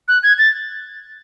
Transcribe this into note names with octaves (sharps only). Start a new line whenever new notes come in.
F#6
G#6
A6